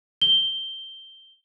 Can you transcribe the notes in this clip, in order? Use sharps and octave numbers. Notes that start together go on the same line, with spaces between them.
G7